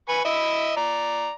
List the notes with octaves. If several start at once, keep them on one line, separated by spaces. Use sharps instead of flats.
B4 G#5 C#6
E4 D#5 E5
D5 A#5